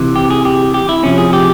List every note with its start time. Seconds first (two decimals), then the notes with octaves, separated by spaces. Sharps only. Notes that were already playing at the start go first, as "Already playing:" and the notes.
Already playing: C3 E3
0.16 G4
0.31 G#4
0.45 G4
0.74 G4
0.89 E4
1.04 C3 F3 C#4
1.18 G#4
1.33 G4